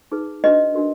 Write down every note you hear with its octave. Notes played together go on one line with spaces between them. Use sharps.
D#4 G#4 B4
D4 F#4 B4 D#5
D4 F#4 A#4